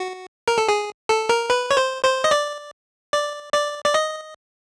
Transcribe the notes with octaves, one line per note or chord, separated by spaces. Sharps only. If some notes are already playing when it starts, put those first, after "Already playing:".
Already playing: F#4
A#4
A4
G#4
A4
A#4
B4
C#5
C5
C5
D#5
D5
D5
D5
D5
D#5